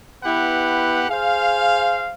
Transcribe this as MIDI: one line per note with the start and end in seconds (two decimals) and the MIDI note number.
0.24 1.05 59
0.24 1.05 64
0.24 1.05 67
0.24 1.05 71
0.24 1.05 78
1.09 2.13 68
1.09 2.13 72
1.09 2.13 77